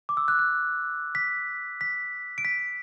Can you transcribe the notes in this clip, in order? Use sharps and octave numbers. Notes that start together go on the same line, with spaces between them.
D6
E6
F#6
F#6
B6
B6
D7
B6